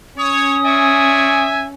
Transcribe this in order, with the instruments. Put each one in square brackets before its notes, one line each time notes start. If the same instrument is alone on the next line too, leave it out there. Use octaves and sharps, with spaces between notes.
[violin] C#4 [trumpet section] C#5 [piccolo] D#6
[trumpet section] G#3 D5 C#6 [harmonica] E5 G#5